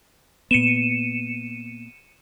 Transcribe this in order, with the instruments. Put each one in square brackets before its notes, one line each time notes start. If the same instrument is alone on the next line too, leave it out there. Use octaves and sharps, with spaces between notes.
[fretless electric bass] A#2 B3 [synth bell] C#7 D#7 E7